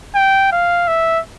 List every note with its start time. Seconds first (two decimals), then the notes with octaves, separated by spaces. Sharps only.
0.15 G5
0.52 F5
0.88 E5